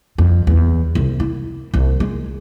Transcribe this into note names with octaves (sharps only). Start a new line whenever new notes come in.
F2
E2
C2
E4
C2
G#3